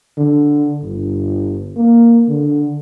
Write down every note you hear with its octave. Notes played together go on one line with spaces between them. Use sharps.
D3
G1
A#3
D3